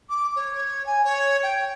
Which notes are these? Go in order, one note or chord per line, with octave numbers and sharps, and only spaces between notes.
D6
C#5
G#5
C#5
G5